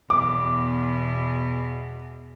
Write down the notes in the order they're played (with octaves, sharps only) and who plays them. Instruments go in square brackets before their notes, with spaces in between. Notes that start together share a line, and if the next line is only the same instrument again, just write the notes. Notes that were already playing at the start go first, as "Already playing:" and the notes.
[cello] E2 B2 [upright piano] D6